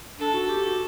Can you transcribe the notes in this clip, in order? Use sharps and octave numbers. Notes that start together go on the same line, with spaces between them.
D4 A4
F#4
G4
F#4